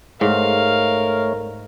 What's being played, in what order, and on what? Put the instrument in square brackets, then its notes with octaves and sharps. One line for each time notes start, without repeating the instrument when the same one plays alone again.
[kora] G#2 [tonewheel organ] A3 C#5 [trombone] A#4 [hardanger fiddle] F5